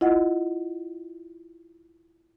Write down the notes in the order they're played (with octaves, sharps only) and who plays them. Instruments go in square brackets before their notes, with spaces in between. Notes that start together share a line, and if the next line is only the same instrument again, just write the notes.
[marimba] E4 F4 D#5 F#5